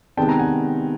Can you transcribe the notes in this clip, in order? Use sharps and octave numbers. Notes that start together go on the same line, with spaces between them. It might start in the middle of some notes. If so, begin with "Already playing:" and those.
C3 D#3 G#3 B3 G5 A5
G#5 A#5
F#5 G#5